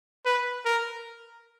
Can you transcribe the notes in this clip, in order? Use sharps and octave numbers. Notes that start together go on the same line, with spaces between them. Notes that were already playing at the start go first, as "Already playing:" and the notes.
B4
A#4